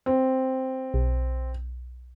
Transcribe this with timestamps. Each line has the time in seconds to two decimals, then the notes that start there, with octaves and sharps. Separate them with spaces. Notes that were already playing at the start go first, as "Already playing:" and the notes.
0.06 C4
0.94 B1